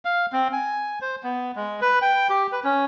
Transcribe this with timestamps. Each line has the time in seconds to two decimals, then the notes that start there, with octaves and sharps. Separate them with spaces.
0.05 F5
0.33 C4
0.53 G#5
1.01 C5
1.24 B3
1.56 G#3
1.82 B4
2.02 G5
2.30 G4
2.52 B4
2.64 C#4